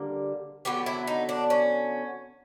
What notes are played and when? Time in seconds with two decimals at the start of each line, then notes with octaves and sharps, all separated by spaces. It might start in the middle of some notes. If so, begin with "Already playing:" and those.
Already playing: D3 G3 A#3
0.65 D3 F#3 B3 G4
0.86 E4
1.07 D#4
1.29 D4
1.50 C#4